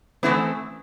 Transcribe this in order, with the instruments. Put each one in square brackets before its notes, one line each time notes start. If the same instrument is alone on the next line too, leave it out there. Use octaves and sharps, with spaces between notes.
[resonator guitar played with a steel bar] E3 A3 C4 E4 A4 [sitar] B3